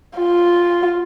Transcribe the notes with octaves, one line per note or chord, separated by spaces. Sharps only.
F4